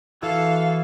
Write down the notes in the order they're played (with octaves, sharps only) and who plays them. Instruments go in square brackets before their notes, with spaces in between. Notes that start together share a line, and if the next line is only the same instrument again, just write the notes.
[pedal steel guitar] E3 E4 F#4 [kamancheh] A4 F5